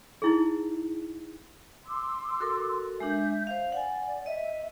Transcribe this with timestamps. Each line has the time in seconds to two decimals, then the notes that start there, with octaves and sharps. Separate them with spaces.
0.22 D#4 E4 G#4
1.86 C6 D6 E6
2.40 F#4 A4 A#4
3.00 G#3 D4 E5 G6
3.47 C5 F5
3.72 D5 F#5 G#5
4.26 D#5 E5